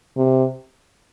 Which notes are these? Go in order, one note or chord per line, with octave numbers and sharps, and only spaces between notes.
C3